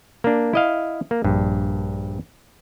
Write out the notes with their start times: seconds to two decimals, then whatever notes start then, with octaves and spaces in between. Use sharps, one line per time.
0.24 A#3 D4
0.53 E4 D#5 F5
1.11 A#3
1.24 A#1 G2